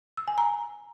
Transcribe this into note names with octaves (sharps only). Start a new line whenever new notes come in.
E6
G#5
A#5